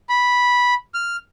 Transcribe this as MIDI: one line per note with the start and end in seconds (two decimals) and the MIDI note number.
0.09 0.74 83
0.94 1.16 89